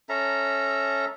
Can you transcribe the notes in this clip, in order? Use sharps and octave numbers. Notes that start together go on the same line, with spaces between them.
C#4 A4 E5 A#5